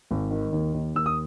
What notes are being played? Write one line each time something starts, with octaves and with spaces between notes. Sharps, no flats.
G#1
D#3
D#2
D#2
D#2 E6
D#6